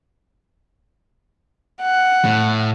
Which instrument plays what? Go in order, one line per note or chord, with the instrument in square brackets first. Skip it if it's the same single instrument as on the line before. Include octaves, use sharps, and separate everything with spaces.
[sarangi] F#5
[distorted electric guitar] A2